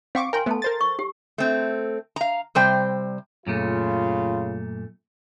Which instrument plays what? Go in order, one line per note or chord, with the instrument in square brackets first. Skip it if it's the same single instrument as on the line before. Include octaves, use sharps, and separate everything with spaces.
[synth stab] C4 C#6 D6 [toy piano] F5 F#5
[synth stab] A#4 G5 [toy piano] G#5 C6
[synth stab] A3 B3 [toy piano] A4 A5
[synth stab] A#4 C5 A6
[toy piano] C#6
G4
[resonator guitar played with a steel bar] A3 C4
F5 A#5
C3 G3 C5 G5
[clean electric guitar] F#2 A#2 A3 [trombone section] C#3 F4